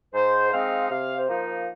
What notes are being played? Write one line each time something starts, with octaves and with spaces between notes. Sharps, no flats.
G#2 C5
G#3 C4 D#4 F5
C3 F5
C5
F3 A#3 D#4